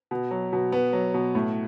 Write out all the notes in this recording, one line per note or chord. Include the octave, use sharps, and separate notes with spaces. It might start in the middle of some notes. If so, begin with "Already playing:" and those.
B2
F#3
B2
B2 B3
F#3
B2
A2